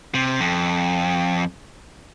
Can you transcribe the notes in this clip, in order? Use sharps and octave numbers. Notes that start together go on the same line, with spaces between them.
C3
F2